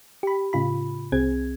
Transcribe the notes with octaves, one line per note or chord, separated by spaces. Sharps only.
G4 B5
A2 C#3 F4 B5
C2 C4 G#4 G#6